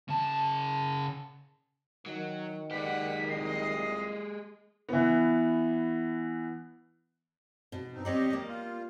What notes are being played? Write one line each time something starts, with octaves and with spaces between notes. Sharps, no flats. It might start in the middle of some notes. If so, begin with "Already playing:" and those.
C#3 A5
D#3 F#3
G#3 G4 B4 D5 F#5 B6
C2 A#2 D#5 C7
E3 B3
B2
G2 C4 D#4
G3 C4 G4 C#5 D#5
G3 A#3
F4